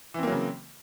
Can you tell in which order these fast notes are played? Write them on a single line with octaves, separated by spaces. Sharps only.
E3 C4 A#3 F#3 C#3